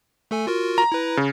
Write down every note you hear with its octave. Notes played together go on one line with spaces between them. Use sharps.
A3 A4 G#5
F4 F#4 A#4
A#5
E4 B4
C#3